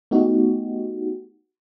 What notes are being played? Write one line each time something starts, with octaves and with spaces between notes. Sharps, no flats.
A3 B3 D#4 F#4 G4